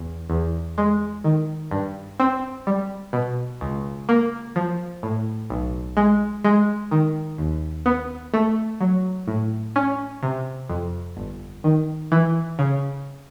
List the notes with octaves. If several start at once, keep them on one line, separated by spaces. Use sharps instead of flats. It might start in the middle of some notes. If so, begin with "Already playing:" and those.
Already playing: E2
E2
G#3
D#3
G2
C4
G3
B2
C#2
A#3
F3
A2
B1
G#3
G#3
D#3
D#2
B3
A3
F#3
A2
C#4
C3
F2
G1
D#3
E3
C#3